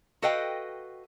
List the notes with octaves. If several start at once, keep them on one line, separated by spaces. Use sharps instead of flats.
F#4 A4 B4 D#5 F5 G5